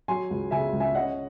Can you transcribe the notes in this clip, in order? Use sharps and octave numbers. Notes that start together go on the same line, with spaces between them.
F#3 G#5 C6
C#2
C#3 E5 G#5
C#2
E5 G#5
C#4 D#5 F#5